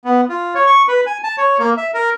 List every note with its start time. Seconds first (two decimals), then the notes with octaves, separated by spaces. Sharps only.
0.05 B3
0.29 F4
0.55 C#5
0.66 C#6
0.88 B4
1.07 G#5
1.24 A5
1.38 C#5
1.59 A#3
1.77 E5
1.94 A#4